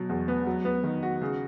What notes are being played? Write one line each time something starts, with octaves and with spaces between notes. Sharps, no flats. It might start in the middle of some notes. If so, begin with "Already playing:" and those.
Already playing: B2 F#3
E2
B3
F#3
B3
D#3
F#4
C#3